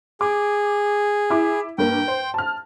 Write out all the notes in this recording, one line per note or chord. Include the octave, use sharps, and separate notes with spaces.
G#4 D6
E4 D6
G2 A#3 G5
C5
A5 F6